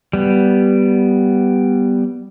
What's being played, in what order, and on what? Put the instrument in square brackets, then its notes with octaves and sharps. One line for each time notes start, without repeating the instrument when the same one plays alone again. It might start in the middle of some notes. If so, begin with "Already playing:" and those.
[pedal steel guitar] G3 B3